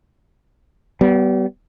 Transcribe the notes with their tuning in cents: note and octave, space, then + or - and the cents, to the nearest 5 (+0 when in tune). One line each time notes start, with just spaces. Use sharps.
G3 -35 B3 +0